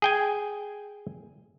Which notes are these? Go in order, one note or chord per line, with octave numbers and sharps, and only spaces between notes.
G#4 G5 G#5